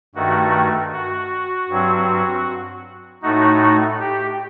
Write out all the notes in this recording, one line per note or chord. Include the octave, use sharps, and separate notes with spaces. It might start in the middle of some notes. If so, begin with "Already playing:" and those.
G2 D#3 A3 F#4
F#4
G2 F#3 C4
A2 A3 D#4 F#4
G4